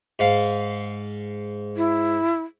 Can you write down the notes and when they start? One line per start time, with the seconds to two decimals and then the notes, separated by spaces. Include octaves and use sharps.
0.19 G#2 F5
1.77 E4